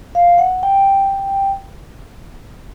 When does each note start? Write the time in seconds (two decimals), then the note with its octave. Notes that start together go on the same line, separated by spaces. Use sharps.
0.15 F5
0.38 F#5
0.63 G5